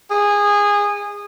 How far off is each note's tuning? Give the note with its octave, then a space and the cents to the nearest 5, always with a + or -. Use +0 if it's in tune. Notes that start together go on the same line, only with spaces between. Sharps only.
G#4 -20